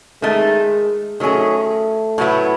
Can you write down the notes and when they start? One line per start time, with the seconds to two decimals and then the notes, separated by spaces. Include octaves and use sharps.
0.22 D#3 G#3 A3 D#4
1.20 D#3 F#3 A3 C#4 G#4
2.18 A2 F#3 B3 E4